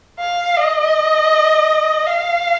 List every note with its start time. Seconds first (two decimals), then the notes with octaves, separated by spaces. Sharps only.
0.19 F5
0.57 D#5
2.06 F5